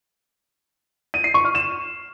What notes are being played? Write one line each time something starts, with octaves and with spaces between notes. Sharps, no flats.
D#7
C7
C#6
F6
E7